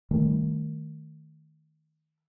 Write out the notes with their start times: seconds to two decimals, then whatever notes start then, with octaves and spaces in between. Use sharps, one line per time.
0.11 D#3 G3 A3